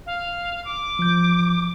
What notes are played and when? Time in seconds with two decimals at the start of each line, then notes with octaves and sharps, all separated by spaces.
0.06 F5
0.65 D6
0.99 F3 G6